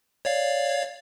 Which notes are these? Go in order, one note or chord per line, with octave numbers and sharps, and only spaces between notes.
C#5 D5 F5